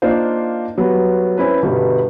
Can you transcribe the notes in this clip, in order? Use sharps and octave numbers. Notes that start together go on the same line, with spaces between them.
A#3 D4 D#4 F4 C5
F#3 G3 B3
C4 C#4 E4 B4
G1 B2 G3